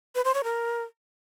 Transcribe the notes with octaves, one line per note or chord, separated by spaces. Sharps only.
B4
C5
C#5
A#4